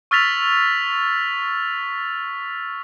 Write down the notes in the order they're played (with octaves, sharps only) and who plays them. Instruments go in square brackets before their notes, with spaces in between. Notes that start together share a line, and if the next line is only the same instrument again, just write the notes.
[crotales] C#6 E6 F6 A6 B6 F7